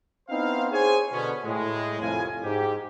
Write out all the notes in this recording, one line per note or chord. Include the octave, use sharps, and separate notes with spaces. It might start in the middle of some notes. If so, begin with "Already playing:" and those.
B3 C4 D#4 E4 C5 F5
G#4 C5 C#5 G#5
B2 D3 B3 C#4
A2 G#3
C2 F2 A2 F4 G#5
G#2 G4